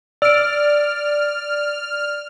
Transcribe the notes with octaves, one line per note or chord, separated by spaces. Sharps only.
D5 E6 F6 D7